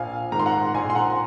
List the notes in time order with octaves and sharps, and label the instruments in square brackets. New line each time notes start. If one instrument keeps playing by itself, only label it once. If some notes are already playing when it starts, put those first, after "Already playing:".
Already playing: [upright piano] A#1 F5 G#5
G#2 D#3 A#5
C6
F#5 A#5
A#1 G#5 C6
C6
F#5 A#5